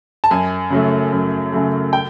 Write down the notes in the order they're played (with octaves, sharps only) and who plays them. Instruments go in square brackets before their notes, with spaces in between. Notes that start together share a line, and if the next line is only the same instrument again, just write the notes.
[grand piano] A5
F#2 G#5
C#3 F#3 A3
F#2
C#3 F#3 A3
G5